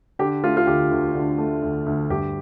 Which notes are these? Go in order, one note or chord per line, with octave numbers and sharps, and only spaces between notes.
D3 G4
A3 F4
F4
D2 G4
D2
D3
A3
D2
D2
G2 G4